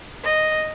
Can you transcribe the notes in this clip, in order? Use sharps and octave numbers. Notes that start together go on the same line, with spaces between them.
D#5